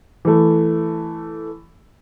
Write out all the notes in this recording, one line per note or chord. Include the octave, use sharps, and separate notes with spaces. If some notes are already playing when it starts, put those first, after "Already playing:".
E3 A3